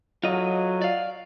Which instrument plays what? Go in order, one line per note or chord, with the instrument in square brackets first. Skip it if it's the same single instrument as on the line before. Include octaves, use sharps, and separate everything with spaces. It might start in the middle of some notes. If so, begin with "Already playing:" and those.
[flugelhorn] F#3 [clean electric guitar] F4 A4 D#5
[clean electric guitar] D5 F5